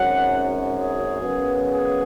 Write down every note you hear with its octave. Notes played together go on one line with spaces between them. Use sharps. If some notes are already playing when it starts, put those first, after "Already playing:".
Already playing: G#1 F#2 F#3 C#4 F#5
G#4
F#2 C#3 B3
G#4